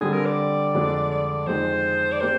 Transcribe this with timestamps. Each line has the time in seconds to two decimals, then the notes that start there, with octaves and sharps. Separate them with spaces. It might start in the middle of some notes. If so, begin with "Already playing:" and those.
0.01 D3 G3 C4 G#4
0.13 A#4
0.26 D5
0.75 F2 D3 G#3 D4
1.11 D5
1.47 F2 D#3 G#3 C5
2.12 D5
2.21 G#3 C4 G4 A#4 C5